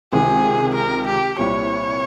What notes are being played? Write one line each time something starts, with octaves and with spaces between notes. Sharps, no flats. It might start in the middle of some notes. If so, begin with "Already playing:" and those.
C#2 C3 D#3 G#3 G#4
A#4
G4
C2 A#2 G3 C4 C#5